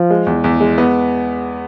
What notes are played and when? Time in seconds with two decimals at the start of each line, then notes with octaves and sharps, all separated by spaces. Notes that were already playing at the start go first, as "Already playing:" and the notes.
Already playing: F3
0.10 G#3
0.26 E2
0.44 E2
0.60 G#3
0.78 B3